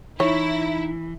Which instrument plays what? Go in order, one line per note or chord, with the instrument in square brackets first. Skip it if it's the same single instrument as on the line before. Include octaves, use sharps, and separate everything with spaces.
[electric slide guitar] E3 [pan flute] D#4 [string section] E4 [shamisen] C#5